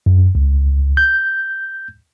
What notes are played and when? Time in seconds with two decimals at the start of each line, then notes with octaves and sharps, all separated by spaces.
0.06 F#2
0.35 C#2
0.97 G6